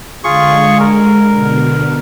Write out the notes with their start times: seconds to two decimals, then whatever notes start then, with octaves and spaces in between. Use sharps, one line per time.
0.24 D3 G#3 F4 G#4 C#6
0.80 A#4
1.30 B2 D3